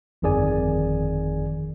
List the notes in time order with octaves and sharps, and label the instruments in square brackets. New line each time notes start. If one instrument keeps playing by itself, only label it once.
[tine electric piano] G1 F2 D#3 G#4 D5 G#5